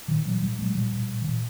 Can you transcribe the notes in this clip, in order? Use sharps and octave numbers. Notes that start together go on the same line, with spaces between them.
A#2 D#3 F3
A#2 E3 F#3
A#2 F3 G3
A#2 F#3 G#3
A#2 F3 G3
A#2
A#2
D#3
A#2 E3